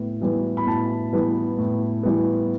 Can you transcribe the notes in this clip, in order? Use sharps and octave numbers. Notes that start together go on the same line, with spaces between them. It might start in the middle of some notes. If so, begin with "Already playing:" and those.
Already playing: A2 B3
E3 G3 B3
B5
A2 A5
E3 G3 B3
A2
E3 G3 B3